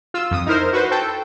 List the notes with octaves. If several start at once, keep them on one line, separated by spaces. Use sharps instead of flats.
F4 E6
F2 D#6
D#4 E4 A#4 C5
F#4 B4 C5
A4 G5